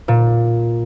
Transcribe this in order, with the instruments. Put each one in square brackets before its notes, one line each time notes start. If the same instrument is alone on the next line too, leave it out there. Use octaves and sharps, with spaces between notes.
[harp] A#2